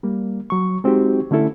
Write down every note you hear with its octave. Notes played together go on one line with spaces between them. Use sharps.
G3 A#3
F#3 C#6
G#3 C4 D#4 F#4 G4
D3 A3 C#4 E4 A4